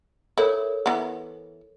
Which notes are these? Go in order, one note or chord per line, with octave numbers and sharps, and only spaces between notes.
E4 A4 A#4 C#5
E3 B3